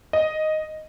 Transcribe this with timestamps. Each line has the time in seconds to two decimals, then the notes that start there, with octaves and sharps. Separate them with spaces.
0.13 D#5